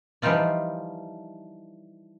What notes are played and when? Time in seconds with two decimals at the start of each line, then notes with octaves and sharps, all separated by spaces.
0.22 E3 F3 G3 D#4 F4 D5